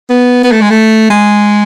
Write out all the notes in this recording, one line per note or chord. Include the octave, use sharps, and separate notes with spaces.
B3
B3
A3
G#3
A3
G#3